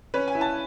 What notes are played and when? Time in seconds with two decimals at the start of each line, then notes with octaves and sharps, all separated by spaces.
0.14 C#4 B4
0.28 G#5
0.35 E4
0.41 A5